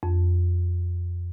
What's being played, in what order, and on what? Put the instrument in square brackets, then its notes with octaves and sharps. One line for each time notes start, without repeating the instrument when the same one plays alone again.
[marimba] F2